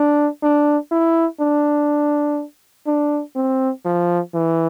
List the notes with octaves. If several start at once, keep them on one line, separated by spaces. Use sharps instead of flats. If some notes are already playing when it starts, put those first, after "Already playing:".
Already playing: D4
D4
E4
D4
D4
C4
F3
E3